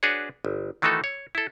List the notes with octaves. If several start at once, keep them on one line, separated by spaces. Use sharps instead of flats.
D4 F#4 G#4 B4 C#5
G1
D#3 E3 A3 D#4 F#4 A4
C#5
E4 A4